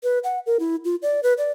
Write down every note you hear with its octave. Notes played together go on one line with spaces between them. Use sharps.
B4
F#5
A#4
E4
F4
D5
B4
D5